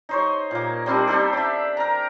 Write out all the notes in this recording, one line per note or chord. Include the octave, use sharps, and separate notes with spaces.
D#4 C5 C#5
A#2 A#3
G3 C4 D4 D#4
D4 D#4 G4 A4
D5 E5
A#4 A#5